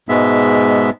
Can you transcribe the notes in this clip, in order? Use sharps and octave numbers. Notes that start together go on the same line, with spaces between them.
G#2 B2 G#3 B3 E5